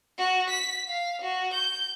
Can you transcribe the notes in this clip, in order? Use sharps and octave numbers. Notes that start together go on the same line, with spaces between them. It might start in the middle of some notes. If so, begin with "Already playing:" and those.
F#4
B6
F5
F#4
G6